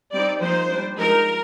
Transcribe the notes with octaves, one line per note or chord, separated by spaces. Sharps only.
G3 C4 D#4 D5
F3 A#3 D#4 C5
G3 D4
F3 G#3 D#4 A#4